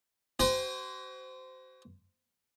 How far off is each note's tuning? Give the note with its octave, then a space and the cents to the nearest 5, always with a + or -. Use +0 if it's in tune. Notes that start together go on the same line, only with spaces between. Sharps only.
F#4 +35 C5 -20 G#5 -45